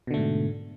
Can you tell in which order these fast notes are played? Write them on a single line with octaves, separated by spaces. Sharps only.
B2 D3 A3 G#2